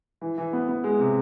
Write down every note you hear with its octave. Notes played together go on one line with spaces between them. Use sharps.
E3
E3
B3
B3
G#3
C3